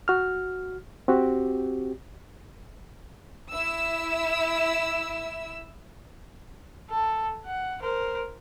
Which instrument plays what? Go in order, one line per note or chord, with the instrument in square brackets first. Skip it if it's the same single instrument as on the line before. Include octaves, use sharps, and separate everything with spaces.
[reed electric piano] F#4 F6
C4 F#4 G4
[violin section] E4 E6
[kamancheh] A4
F#5
A#4 C5